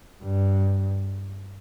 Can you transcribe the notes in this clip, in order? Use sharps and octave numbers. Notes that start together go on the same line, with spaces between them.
G2